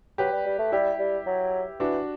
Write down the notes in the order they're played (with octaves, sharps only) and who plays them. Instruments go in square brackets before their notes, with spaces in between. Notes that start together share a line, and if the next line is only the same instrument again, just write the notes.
[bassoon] F#3 [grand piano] G4 B4
[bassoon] G3
G3
A3
[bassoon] G3 [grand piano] E4 G4
[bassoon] G3
F#3
[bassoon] E3 [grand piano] D4 F#4